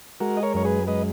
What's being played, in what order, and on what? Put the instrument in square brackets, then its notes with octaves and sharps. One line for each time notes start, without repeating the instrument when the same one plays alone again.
[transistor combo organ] G#3 F#4 A#4
D#5
A#4 C#5
F#2 C#5
G#4 B4
G#3 B4 D#5